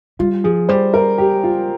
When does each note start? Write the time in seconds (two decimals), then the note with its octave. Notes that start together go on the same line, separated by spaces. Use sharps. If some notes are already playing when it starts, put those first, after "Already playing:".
0.19 G3 F4
0.44 F3 G#4
0.69 G3 C5
0.94 A#4
1.18 G4
1.43 F4